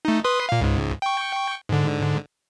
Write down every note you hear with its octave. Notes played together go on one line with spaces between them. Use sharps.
A3 D#4
B4 C6 D#6
A#2 F5
C#2 G#2
G5 C#6
G#2 D3